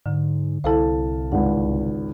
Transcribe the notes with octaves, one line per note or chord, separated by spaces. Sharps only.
G#2 D3
C2 E4 A4 C5 F5 A5
G#1 C#2 F#5